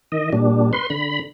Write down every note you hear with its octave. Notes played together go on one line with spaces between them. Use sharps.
D#3 D#5
A#2 G3 D4
B4 C6
D3 B5